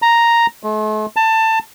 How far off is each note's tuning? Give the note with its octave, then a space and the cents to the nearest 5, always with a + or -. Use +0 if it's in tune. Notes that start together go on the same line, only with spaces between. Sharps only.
A#5 +0
A3 -45
A5 +20